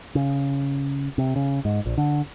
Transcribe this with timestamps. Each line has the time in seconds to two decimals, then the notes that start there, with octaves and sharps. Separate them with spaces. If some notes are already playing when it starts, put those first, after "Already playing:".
0.15 C#3
1.18 C3
1.36 C#3
1.65 G#2
1.86 A#1
1.98 D3